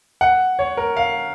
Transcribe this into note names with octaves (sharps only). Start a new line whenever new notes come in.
F#5
C#5
A#4
F5